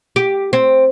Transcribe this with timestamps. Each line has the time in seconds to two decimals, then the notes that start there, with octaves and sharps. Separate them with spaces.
0.16 G4
0.53 C4